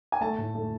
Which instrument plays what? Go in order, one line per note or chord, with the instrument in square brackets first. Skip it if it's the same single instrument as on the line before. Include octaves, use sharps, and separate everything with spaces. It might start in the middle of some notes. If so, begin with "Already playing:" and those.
[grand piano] G#5
[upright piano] A3 [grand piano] A5
[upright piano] A2
A3